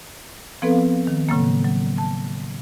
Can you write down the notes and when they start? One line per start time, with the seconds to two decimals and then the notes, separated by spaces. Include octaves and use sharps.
0.62 F3 B3 C4 A4 B4 F5
1.07 D#3
1.29 A2 C#3 F#3 A#3
1.64 F#3
1.98 A5